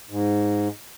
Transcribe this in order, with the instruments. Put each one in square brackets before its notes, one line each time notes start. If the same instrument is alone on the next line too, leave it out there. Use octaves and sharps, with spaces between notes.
[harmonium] G#2